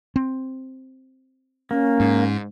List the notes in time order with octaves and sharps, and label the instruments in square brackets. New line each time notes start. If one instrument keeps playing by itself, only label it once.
[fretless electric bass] C4
[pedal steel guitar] A#3 [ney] C#4
[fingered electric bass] G#2